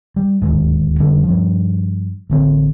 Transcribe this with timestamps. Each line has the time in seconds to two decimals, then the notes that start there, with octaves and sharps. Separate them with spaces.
0.16 G3
0.42 D1 D#2 G#2
1.00 F1 D3 G3 C#4
1.24 G2 F3
2.30 A1 D3 C4